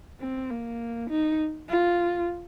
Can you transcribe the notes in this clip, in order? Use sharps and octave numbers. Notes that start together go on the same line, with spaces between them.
C4
A#3
D#4
F4